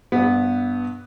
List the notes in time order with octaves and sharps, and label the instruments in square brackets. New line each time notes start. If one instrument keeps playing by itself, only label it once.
[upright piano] G2 B3